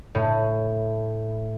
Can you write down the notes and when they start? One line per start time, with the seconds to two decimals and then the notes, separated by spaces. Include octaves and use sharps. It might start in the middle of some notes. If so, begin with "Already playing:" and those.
0.15 A2